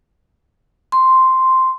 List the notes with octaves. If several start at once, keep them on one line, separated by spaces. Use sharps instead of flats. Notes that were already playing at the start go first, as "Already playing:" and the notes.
C6